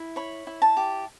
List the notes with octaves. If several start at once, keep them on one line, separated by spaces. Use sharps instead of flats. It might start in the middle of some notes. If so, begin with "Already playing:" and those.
Already playing: E4
C#5 B5
E4
A5
G4